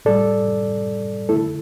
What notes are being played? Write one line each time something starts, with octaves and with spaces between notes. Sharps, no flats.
A2 G3 A4 D5
D3 A3 E4 A4